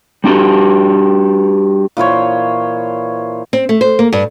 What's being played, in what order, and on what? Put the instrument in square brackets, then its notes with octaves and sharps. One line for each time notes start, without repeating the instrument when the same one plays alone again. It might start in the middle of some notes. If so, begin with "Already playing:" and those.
[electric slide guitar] G3 D4 F#4 G4
[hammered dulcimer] A#2 E3 C5 C#5
[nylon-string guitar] C4
A3
C5
A#3
G2